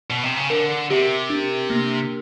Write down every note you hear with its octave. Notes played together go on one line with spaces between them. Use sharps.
B2
C3
C#3
D3 A#4
C3 G4
D4
A#3